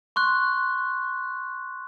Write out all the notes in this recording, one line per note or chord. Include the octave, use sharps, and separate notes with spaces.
C6 C#6 F#6